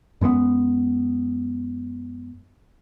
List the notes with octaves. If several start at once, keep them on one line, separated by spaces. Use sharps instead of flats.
F#2 G#3 A3 B3